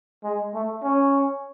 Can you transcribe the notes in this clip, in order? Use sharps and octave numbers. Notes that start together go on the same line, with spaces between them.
G#3
A3
C#4